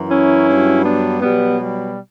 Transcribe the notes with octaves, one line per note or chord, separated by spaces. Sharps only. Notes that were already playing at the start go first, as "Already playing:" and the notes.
Already playing: F#2 E3
C#4 E4
G2 F#3
B3 D4
B2 F#3 G3 B3
G3